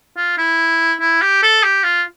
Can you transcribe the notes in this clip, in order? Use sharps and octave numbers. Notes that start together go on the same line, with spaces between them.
F4
E4
E4
G4
A4
G4
F4